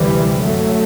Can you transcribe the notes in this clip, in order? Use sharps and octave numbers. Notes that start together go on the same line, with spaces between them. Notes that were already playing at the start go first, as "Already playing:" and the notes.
Already playing: D2 C3 E3 G3
F#2 F#3 A3